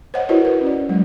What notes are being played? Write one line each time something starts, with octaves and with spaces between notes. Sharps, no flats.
C5 C#5 D#5 F#5
E4 F#4 A#4 B4 C#5 D#5
B4
C#4 D5
F#3 G#3